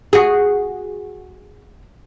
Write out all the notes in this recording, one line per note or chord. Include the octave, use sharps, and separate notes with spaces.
F#4 G#4